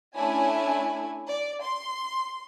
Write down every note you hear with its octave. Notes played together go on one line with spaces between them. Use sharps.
A3 C#4 D4 E4 G#5
D5
C6